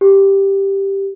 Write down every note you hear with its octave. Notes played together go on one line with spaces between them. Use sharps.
G4